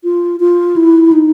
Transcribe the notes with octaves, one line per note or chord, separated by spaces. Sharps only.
F4
F4
E4
D#4